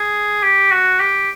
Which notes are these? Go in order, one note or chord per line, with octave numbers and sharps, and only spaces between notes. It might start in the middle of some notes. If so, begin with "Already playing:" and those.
Already playing: G#4
G4
F#4
G4